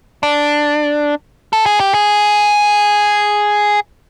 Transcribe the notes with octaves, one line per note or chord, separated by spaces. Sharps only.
D4
A4
G#4
G4
G#4